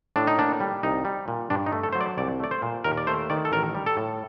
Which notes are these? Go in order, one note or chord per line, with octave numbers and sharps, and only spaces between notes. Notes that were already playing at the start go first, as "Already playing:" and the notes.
A2 D4
D#4
A#3 D4
G3
C2 D#4
G3
A#2
G2 D4
D#4
A3
A4
F#3 C5
D5
C2 D5
A3 D5
C5
A#2
D#2 A#4
D5
A3 C5
D#3 D5
A4
A1 A#4
G3
A4
A2